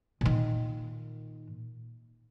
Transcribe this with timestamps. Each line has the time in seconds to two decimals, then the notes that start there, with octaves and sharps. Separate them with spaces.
0.21 A#2 D#3